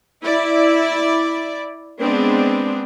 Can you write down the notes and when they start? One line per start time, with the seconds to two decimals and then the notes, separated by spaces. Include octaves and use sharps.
0.24 E4 D5
2.00 G#3 B3 C4 D4